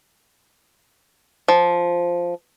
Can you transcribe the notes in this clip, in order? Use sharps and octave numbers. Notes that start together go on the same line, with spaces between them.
F3